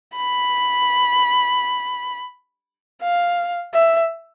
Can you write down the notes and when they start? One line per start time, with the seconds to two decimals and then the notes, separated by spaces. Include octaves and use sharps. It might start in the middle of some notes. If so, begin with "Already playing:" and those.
0.16 B5
3.02 F5
3.74 E5